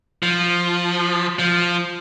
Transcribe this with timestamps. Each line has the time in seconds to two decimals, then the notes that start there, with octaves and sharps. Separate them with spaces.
0.23 F3
1.39 F3